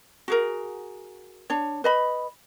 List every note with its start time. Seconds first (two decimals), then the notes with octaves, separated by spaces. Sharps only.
0.28 F#4 G#4 A#4
1.50 D4 C#5
1.84 B4 D#5 B5